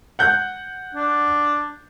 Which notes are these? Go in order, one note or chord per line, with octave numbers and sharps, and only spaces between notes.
F#5 F#6 G6
D4